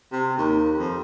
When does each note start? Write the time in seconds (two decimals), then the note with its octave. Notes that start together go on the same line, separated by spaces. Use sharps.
0.12 C3
0.38 D#2
0.78 F2